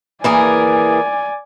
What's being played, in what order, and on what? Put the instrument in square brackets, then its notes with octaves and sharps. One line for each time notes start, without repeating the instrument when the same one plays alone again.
[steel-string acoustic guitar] E3 A#3 G#4 [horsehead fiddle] D5 G#5